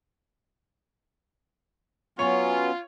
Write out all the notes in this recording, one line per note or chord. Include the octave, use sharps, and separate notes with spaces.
F#3 B3 C#4 F4 C#5